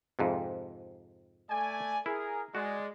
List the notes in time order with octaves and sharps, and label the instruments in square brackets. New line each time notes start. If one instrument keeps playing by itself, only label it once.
[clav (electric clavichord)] F2 G#2 C3
[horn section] A3 D5 G#5
[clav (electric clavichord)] E4 [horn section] G#4 A#4
[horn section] G#3 D5 [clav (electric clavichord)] F#4